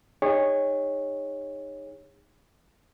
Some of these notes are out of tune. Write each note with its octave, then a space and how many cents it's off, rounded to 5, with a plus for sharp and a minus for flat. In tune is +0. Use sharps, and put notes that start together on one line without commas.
D#4 -10 G#4 -40 C#5 -10